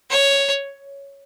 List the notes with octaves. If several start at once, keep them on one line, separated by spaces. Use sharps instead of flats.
C#5